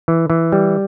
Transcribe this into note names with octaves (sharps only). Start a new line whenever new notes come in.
E3
E3
G3